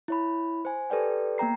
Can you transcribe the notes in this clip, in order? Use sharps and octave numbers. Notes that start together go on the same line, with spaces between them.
E4 C#5 B5
C5 G#5
G4 A4 B4 D5 G5
A#3 B3 G5 A#5 C7